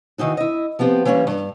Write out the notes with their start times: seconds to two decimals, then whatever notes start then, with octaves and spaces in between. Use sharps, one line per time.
0.18 D#3 E3 D#4 F#4
0.37 E4 D#5
0.79 F3 B3 C4 G4
1.05 E3 G3 A#3 C#4
1.27 G2